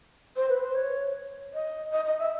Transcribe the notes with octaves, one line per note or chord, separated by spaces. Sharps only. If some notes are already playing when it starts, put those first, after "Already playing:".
C5
B4
C5
C#5
D#5
D#5
D#5
E5